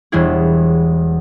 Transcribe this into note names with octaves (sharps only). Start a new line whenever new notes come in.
E1 E2 G3 B3 E4 G#4